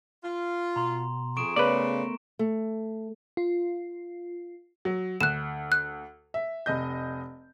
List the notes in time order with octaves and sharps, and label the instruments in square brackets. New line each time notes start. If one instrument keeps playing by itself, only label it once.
[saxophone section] F4
[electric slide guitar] B2 [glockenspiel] A#5 C6
[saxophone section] F2 G#4 [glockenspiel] C#6 D7 E7
[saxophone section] C#3 [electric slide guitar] A3 B3 A#4 [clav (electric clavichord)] B4 D5
[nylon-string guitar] A3
[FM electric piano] F4
[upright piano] F#3
[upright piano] D2 [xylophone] F#6 E7
[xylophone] F#6
[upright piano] E5
F1 D#5 G6